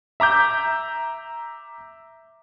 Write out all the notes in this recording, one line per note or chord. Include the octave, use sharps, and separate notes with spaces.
E5 A#5 D6 G6